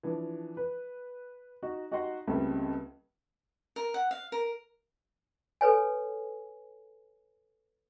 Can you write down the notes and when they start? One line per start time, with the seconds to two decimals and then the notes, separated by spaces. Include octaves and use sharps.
0.03 E3 F3 D4
0.57 B4
1.63 D#4 F#4
1.91 D#4 F#4 G4 D#5 F#5 C6
2.27 C#2 C#3 G3 A3 A#3 C4
3.76 A#4
3.94 F#5
4.11 F5
4.32 A#4
5.61 A4 B4 C#5 G#5